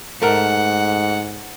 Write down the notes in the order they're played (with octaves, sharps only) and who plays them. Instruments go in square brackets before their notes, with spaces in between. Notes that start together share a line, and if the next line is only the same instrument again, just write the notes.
[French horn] G#2 [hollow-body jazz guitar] A3 A#4 [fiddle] F#5